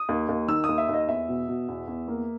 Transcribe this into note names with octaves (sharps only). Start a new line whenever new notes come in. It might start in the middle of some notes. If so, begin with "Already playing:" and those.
Already playing: D#6
D#2
D#2
D#3 E6
D#2 D#6
E5
D#2 D#5
E2 E5
B2
B2
E2
E2
A#3